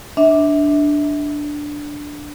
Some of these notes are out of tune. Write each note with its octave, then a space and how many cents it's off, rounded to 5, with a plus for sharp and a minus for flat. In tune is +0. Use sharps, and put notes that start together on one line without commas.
D4 +0 E5 -25